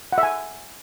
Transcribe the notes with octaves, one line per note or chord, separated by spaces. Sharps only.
F#5
E5
G#5